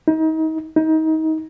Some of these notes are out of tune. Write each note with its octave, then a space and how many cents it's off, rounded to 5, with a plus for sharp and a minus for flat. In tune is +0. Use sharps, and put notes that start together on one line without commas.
D#4 +30
D#4 +25